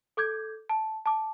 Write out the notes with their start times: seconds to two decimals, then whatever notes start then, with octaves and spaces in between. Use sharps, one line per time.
0.17 A4 D6 G6 G#6
0.69 A5
1.06 A5 D6